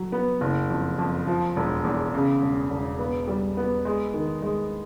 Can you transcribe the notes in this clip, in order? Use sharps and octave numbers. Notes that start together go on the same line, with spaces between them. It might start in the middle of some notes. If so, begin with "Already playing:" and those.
Already playing: F#3
B3
F#1
F2
F2
F3
E1
E2
C#3
E1
E1
B3
G3
B3
G#3
D#3
G#3